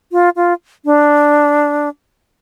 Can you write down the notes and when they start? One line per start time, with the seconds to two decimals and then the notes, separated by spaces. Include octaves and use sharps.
0.12 F4
0.36 F4
0.85 D4